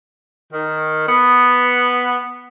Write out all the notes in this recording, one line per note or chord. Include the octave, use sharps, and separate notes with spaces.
D#3
B3